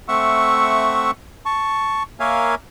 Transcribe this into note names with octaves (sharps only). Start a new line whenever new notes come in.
A3 C4 E5 F#5 C#6 E6
A5 C#6
A#3 A#4 C#5 E5 F5 G#5